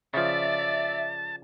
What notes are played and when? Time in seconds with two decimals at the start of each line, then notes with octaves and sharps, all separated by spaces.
0.14 C#3 F3 D5 E5 A5